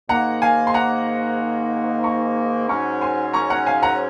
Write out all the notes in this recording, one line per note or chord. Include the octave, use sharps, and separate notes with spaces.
G#2 D#3 A#3 F#5 A#5
F5 G#5
C6
F#5 A#5
A#5 C#6
G#2 F#3 C#4 A#5 C#6
G#5 C6
A#5 C#6
F#5 A#5
F5 G#5
F#5 A#5